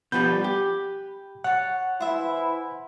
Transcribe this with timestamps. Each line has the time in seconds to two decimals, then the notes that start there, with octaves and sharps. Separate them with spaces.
0.12 B2 F3 G3 B4 G#5 G6
0.44 G4
1.44 C#5 F#5 A5
2.00 E3 E4 C5 E5